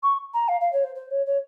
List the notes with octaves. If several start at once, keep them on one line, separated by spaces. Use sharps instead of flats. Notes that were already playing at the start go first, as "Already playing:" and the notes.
C#6
A#5
F5
F5
C#5
C5
C5
C#5
C#5